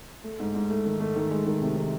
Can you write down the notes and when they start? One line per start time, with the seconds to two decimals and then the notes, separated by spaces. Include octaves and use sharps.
0.24 A3
0.40 G#2
0.55 G#2
0.70 A3
0.85 D#3
1.00 A3
1.16 D#3
1.31 G#3
1.46 D#3
1.62 C3
1.76 D#3